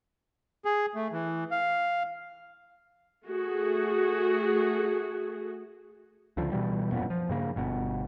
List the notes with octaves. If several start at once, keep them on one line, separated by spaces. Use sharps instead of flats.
G#4
A3
E3
F5
A3 F#4 G#4
C#2 D3 F3
B2 E3 G3
E1 F#2 A#2 B3
F3
G2 C#3 A#3
G1 B2